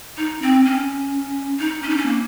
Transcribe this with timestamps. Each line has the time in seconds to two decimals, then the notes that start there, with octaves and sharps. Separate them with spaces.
0.18 D#4
0.42 C4
0.65 C#4
1.60 D#4
1.83 C#4
1.90 D#4
1.97 C#4
2.06 A#3